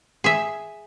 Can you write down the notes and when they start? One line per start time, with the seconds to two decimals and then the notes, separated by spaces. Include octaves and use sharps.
0.24 G#4 E5